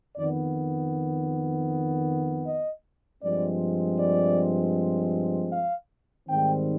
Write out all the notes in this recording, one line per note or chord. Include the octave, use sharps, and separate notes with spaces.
F2 D#3 B3 D5
D#5
G2 F3 G#3 C4 D5
D5
F5
G#2 D#3 G3 C4 G5